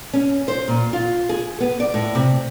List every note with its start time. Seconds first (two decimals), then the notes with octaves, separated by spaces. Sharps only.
0.13 C#4
0.48 C5
0.68 A#2
0.93 F4
1.29 G#4
1.60 B3
1.80 D5
1.94 A2
2.15 C3